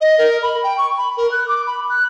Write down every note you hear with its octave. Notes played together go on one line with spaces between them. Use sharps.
D#5
A#4
B5
G5
C#6
B5
A#4
F#6
D6
B5
F#6